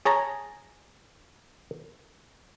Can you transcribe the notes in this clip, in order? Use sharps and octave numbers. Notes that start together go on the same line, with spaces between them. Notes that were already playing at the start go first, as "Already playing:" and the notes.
G#4 C#5 A5 A#5